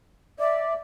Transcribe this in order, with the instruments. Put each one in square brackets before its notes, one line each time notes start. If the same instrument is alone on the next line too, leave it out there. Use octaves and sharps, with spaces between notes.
[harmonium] D5 [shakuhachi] E5